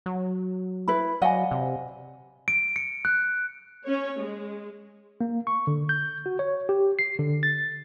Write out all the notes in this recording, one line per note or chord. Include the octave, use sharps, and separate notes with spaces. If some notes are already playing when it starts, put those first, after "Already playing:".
F#3
E4 B4 B5
F#3 D5 D#5 F5 F#5 G#5
C3
D7
C#7
F#6
C#4 C#5
G#3
A#3
C#6
D3
G6
F#4
C#5
G4
C7
D3
A6